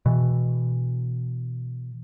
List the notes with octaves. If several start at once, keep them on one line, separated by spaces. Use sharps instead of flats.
B2 E3